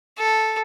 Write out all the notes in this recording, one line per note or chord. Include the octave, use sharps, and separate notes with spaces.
A4